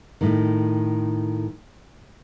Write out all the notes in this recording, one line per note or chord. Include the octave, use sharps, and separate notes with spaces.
A2 D#3